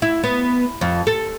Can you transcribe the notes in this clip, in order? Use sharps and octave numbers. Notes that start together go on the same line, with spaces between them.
E4
B3
F2
A4